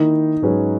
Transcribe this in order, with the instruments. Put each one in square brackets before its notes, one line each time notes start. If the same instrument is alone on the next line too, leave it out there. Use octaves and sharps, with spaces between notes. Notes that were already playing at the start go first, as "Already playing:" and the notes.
Already playing: [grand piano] D#3 A#3 E4 A#4 [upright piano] D#4
[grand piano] G#2 F#3 C#4 G#4 B4